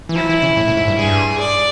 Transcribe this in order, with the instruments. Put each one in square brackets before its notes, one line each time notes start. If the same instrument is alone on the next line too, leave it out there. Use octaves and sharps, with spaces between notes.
[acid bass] E3
[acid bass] F3 [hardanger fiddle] E4
[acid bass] E3
C#3
A2
A2
G#2
G2
[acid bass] G2 [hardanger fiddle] G#4
[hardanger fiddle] D5